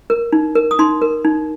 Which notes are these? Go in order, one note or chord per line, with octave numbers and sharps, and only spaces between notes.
A#4
D#4
A#4
D#6
D#4 C6
A#4
D#4